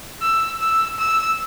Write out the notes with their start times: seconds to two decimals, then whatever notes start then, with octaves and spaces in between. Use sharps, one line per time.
0.22 E6
0.60 E6
0.99 E6